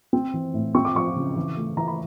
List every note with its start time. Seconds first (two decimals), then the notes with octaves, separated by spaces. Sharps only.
0.13 C4
0.34 E3
0.54 A2
0.75 C4 C#6
0.85 D6
0.95 F3 C#6
1.16 C#3
1.36 E3
1.57 A3
1.77 E3 A#5
1.88 B5